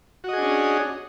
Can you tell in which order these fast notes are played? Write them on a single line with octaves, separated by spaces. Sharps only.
F#4 D#5 G#4 D4 C#4